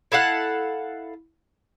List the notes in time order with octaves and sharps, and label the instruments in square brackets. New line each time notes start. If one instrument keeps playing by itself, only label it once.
[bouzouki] E4 A4 F5 F#5